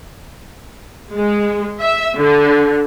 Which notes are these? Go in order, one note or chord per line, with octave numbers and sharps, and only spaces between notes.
G#3
E5
D3